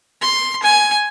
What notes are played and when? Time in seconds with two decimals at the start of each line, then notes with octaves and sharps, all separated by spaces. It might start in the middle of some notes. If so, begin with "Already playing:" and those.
0.21 C6
0.63 G#5